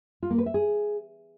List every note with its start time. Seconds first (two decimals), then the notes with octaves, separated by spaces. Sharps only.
0.23 F4
0.30 A#3
0.38 B4
0.46 E5
0.54 G#4